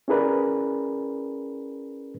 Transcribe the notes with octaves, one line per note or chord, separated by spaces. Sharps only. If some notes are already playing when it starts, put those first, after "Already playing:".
C#4 E4 G#4 A#4 B4 D5